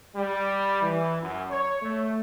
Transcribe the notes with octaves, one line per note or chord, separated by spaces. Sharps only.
G3
E3
F#2
C#5
A3